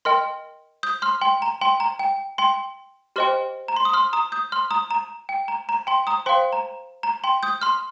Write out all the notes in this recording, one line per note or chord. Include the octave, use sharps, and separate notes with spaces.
A#4 D#5 G5 C6 F6
D#6 G6
C6 F6
G5 C6
A#5
G5 C6
A#5
G5
G5 C6
G4 C5 D#5 G5 C6 F6
A#5
C6
D#6
C6 F6
A#5 D#6
D#6 G6
C6 F6
A#5 D#6
A#5
G5
A#5
A#5
G5 C6
A#5 D#6
C5 F5 G5 C6
A#5
A#5
G5 C6
D#6 G6
C6 F6